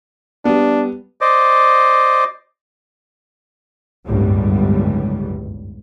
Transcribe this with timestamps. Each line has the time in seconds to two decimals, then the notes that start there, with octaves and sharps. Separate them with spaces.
0.45 G3 B3 D4
1.21 C5 D5 D#5
4.06 G1 C#2 F#2 A2 G3